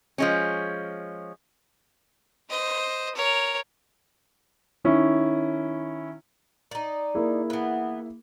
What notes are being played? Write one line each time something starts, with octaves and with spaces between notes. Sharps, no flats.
F3 G#3 C#4
C5 D#5
A#4 C#5
D#3 C#4 E4
D#4 D5
A#3 E4 G#4
E3 B3